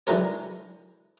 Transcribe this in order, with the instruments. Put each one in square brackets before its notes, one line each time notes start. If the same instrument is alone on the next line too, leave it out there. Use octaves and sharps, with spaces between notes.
[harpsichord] D3 E3 F#3 G#3 A#4 C#5